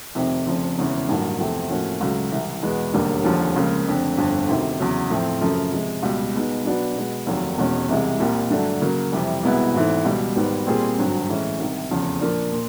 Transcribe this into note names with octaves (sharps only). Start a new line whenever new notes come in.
F1 F2 C3 D#3
F1 F2 C#3 F3
E1 E2 C#3 E3
A1 G2 D#3 F#3 A#3
E2 C3 F3 A3 C4
A2 F3 A#3 C#4 F#4
C#2 C#3 F#3 A3
C2 C3 E3
E2 B2 G#3 B3
E1 D#2 D3 G3 A#3
F1 D#2 D3 F3
C#2 C#3 F3 A#3
F1 F2 D3
G1 F2 D3
D2 C3 D#3
E2 C#3 F#3
A2 F3 A3 C4
F#2 C#3 F3 A3
C3 F3 G#3
C#2 B2 G3
B2 G#3 B3 D#4
B1 B2 F#3 B3 D4
B2 G#3 B3
F1 D#2 D#3 F#3 A#3
E1 E2 B2 G#3 C#4
C2 C3 E3 G#3
C2 A#2 G3 A#3
G2 D3 F#3 A3 D4
C#3 F#3 A#3
F2 C3 E3 G3
C2 B2 G#3 B3 E4
G#1 G#2 E3 A3
C#2 B2 G3
G#1 G#2 D#3 G3 B3
A#2 G3 C4 F4 G#4
G#1 G2 D3 F#3
A2 E3 G#3 C#4
C2 C3 D#3
F1 E2 C#3 F3
A#2 F3 A#3 D4
A#2